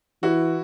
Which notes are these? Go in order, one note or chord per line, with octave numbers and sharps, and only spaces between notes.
E3 E4 F#4